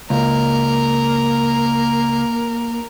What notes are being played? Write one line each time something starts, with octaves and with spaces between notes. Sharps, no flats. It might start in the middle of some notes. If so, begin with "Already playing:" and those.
C#2 A#3 A#4